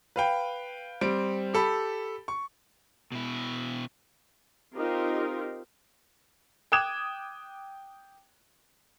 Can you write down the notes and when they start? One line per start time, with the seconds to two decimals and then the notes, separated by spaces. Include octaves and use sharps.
0.16 B4 F5 G5
1.01 G3 C4 D7
1.54 G4 A4 B5
2.28 C#6
3.12 B2 E4
4.75 C4 D#4 F4 G4 A#4
6.72 G5 D6 D#6 F#6 G#6 E7